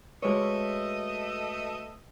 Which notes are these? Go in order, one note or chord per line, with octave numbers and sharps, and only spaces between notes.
G#3 A3 F#4 B4 C#5 D#5 E5